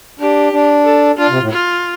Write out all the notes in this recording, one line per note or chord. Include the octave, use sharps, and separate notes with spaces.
D4 G4
D4
A4
D4 F4
C3
A2
F4